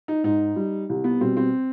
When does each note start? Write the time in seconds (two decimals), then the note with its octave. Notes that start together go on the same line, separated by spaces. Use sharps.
0.08 D#4
0.24 G#2 D#4
0.56 G3
0.89 C2
1.04 B3
1.21 B2 G3 C4
1.37 C4